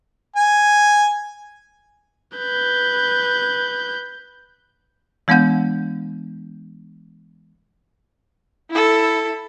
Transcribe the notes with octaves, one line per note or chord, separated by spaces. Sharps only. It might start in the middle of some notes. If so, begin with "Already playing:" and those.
G#5
B4 G6
E3 G#3 B3 D4 F#5 G6
E4 A4